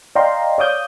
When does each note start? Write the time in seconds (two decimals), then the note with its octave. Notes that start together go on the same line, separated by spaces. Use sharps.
0.15 D5 D#5 F5 G5 A#5 C6
0.58 C#5 D5 F5 D6 D#6 G6